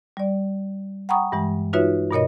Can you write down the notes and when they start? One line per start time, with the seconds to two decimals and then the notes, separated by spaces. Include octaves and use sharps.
0.17 G3 D5
1.09 F#5 G5 A#5 B5 C#6 D#6
1.32 G2 E3 G#3
1.73 D#4 F4 F#4 B4 C#5 E5
2.11 G2 B2 A#4 C#5 D#5